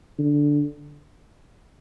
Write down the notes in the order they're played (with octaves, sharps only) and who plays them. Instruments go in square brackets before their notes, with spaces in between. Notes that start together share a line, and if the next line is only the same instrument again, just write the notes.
[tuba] D3